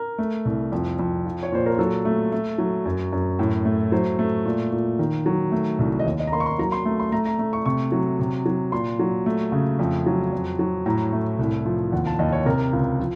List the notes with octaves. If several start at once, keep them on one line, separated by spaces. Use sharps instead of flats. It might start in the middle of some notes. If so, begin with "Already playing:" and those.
Already playing: A#4
A3
C2
F2
F2
F3
C#5
A#2 C5
A#4
F#3 A4
A3
A3
F#3
F#2
F#2
A2
A3
F#3 C5
A3
A#2
A#2
D#3
F#3
A3
C2
D#5
D#2 C#5
D#5
A#5
A#3 C6
C#6
C6
F#3 A#5
C6
A3
C6
A3 A#5
A#5
A3
C#6
C3 C#6
F#3
C3
F#3
A#2 C6
F#3
A3
C#3
F2
F#3
F2
F#3
A2 A#5
A3
C2
F3
D#2 F#5
A5
D#2 D#5
C#5
C3 A#4
C#2
F3